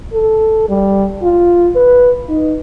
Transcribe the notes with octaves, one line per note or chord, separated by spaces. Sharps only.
A4
G3
F4
B4
D#4